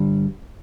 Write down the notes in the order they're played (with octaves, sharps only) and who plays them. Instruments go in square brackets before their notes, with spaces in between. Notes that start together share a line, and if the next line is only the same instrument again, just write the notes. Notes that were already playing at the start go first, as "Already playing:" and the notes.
Already playing: [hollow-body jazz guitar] G2 D3 G3